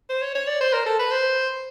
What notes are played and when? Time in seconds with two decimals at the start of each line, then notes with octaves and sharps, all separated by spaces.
0.10 C5
0.22 C#5
0.35 C#5
0.47 D5
0.61 C5
0.73 A#4
0.86 A4
0.99 B4
1.11 C5